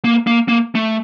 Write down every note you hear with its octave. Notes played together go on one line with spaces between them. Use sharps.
A#3
A#3
A#3
A3